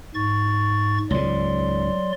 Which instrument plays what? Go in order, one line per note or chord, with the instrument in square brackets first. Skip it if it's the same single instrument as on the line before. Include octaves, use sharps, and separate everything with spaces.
[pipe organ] G#2 C#6 A6
[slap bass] C#2 G#2 [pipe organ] F#3 D5 C6